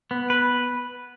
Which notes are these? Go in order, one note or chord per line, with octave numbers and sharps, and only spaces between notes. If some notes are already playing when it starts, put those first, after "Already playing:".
B3
B4